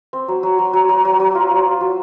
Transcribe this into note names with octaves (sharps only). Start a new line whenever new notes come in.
C4
F#3
F#3
F#3
F#3
F#3
F#3
F#3
F4
F4
F4
F#3